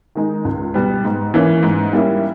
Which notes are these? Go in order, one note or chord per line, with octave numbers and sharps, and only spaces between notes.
D#3 G#3 D#4
C#2
B2 G3 B3
G#2
E3 A#3 C#4
G#2
G3 A#3 C#4 E4